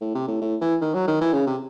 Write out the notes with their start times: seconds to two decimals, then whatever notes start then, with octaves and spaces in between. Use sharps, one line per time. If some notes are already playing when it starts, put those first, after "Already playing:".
0.01 A2
0.15 C3
0.28 A2
0.42 A2
0.61 E3
0.82 D#3
0.94 F#3
1.08 D#3
1.21 E3
1.33 C#3
1.47 C3